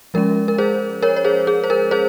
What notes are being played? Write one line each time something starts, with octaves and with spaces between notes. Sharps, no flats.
F3 G#3 C#4 A#4
A#4
G#4 C5
A#4 C#5
C#5
G#4 C5
G#4
C5
A#4
G#4 C5